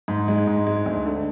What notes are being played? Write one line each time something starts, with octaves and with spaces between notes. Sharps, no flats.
G#2
G#3
G#2
G#3
D2
D3